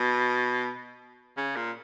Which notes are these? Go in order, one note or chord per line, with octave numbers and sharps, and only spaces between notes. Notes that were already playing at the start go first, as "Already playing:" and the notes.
Already playing: B2
C#3
A#2